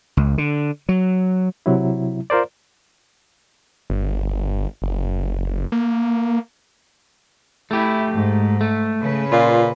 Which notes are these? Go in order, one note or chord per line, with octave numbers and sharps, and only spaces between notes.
C#2
D3
F#3
C3 F#3 E4
F4 A#4 C5 D5
G1
F#1
A#3
A3 E4 G4
G#2
A3
C#3 B4
A#2 F4